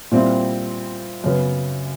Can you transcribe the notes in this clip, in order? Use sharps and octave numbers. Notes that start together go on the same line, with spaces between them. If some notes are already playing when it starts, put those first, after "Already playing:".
A#2 G3 C4 E4
F#2 C#3 F#3 B3